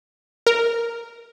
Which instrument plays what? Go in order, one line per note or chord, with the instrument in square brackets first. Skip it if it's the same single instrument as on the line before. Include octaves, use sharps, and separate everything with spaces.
[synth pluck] A#4